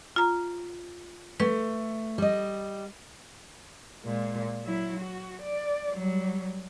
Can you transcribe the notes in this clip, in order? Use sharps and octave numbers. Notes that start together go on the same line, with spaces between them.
F4 A#5
A3 B4
G3 D#5
A#2 G#3
F#3 E4
F#4
D5
F#3 G3